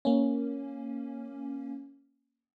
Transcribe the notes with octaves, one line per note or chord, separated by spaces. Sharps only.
A#3 C#4